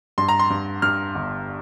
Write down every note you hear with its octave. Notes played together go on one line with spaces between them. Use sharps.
G2 C6
A#5
C6
G2
G2 F6
G1